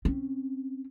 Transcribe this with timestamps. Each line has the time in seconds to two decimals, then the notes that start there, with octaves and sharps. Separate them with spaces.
0.05 C4 C#4